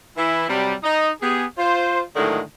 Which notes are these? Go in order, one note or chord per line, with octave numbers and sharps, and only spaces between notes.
E3 E4
C3 F#3 G3
D#4
B3 G4 G#4
F4 C5
A2 D3 D#3 F#3 G#3